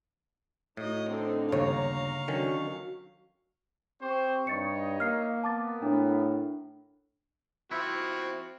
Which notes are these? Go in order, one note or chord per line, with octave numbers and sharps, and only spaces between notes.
A2 D#4 F#4 D#5
D3 C4 D#4 A4
G1 D#2 C#3 C#5 F5 A#5 C#6
D3 D#3 F#3 C#4
C4 G4 C5 C#6
G2 D#4 C#5 D#5 C#6 A6 C#7
A#3 F6 C7
B3 A#4 A5 D6 A6
A2 D4
F3 C4 E4 F#4